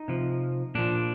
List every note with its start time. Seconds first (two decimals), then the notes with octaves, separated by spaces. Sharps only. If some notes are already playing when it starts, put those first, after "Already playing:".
Already playing: D#4
0.08 C3 F3
0.75 A#2 F3 D4